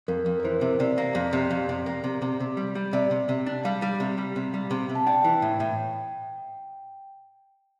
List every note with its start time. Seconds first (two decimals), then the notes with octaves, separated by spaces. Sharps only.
0.08 F2 A#4
0.26 F2
0.40 A#4
0.44 E3 C5
0.61 C3
0.80 C3 D5
0.98 A#3
1.15 F2
1.33 C3
1.51 F2
1.69 C3
1.86 A#3
2.04 C3
2.22 C3
2.40 C3
2.57 G3
2.75 G3
2.93 C3 D5
3.11 C3
3.29 C3
3.46 D4
3.64 G3 F5
3.82 G3
4.00 C3
4.18 G3
4.36 C3
4.54 G3
4.71 C3
4.89 C3
4.95 A5
5.07 D4 G5
5.24 E3
5.42 A2
5.60 A2